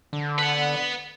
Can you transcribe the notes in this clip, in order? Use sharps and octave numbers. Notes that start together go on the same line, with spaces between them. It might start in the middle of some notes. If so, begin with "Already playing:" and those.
D3
B4 F#5